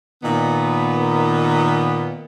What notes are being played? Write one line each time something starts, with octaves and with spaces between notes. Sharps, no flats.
A#2 D#3 B3